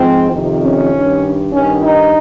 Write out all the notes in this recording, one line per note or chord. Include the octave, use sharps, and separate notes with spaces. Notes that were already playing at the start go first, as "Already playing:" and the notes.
Already playing: G#2 F3 C4
F2 C3 D#3
C#4
G2 D#3
G2 D#3 C#4
D#4